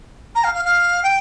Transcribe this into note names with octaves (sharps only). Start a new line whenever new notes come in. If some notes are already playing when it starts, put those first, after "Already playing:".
A#5
F5
F5
F5
G5